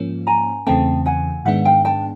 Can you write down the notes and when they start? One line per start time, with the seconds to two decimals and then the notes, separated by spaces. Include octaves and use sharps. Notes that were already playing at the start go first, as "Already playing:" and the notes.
Already playing: G#2 F3 A#3 C#4
0.27 G#5 A#5
0.66 E2 C#3 E3 A3 C4 G5 A5
1.06 F#5 G#5
1.45 G#2 D#3 G#3 B3 D4 E5 F#5
1.65 F5 G5
1.85 G5 A5